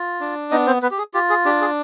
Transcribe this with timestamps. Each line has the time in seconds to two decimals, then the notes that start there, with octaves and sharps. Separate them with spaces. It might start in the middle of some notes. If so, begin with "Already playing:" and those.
Already playing: F4
0.20 D4
0.51 B3 D#4 D#5
0.67 C4 C5
0.82 B3 B4
0.91 G4
0.98 G#4
1.14 F4 G4
1.30 G#4
1.45 D4 G4
1.61 G#4